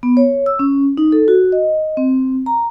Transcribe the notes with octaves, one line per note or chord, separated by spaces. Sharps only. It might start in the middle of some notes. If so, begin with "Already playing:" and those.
B3
C#5
E6
C#4
D#4
A4
F#4
D#5
C4
A#5